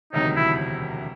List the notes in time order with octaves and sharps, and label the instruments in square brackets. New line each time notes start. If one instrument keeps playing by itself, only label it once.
[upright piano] E1 D2 C3 D#3 F#3 [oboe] D#4
[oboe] E4